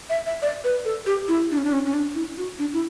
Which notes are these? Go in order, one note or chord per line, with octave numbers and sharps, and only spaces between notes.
E5
E5
D5
B4
A4
G4
E4
D4
C#4
D4
C#4
C#4
D4
E4
F#4
D4
E4